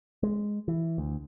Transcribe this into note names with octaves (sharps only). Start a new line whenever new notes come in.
G#3
E3
D2